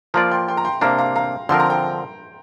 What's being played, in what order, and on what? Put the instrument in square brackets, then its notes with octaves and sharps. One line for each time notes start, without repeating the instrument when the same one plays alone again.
[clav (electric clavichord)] F3 A#3 F4 D5 [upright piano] F5 A#5
[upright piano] G5 C6
G5 C6
A#5
G5 C6
[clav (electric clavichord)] C3 A#3 D4 [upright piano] F5 A#5
[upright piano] F5 A#5
F5 A#5
[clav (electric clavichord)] D3 F3 C4 A#4 [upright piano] C6
[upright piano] A#5
G5